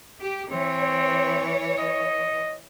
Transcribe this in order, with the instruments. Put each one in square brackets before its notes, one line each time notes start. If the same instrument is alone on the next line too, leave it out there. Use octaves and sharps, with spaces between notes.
[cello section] G4
[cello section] E3 C#5 [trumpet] C4
[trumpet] D#5